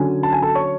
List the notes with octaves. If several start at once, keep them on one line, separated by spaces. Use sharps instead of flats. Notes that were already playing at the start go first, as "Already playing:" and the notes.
Already playing: D3 F#3 C#4 G#5
A5
G#5
A4 A5
C#5 C#6